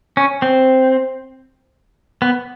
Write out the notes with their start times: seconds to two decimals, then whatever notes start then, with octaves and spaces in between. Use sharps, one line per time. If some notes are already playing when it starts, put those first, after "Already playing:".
0.17 C#4
0.42 C4
2.22 B3